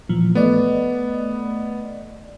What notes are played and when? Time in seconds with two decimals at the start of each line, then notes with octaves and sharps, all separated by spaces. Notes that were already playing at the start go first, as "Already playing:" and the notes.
0.09 A#2 E3 F3
0.35 A3 B3 D5 D#5